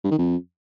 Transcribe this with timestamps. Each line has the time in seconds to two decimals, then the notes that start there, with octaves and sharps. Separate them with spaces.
0.04 G2
0.11 D#3
0.18 F2